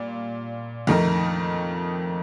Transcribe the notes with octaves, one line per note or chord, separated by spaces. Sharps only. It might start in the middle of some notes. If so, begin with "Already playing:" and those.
Already playing: A#2 G3
F2 D#3 A3 D#4 A#4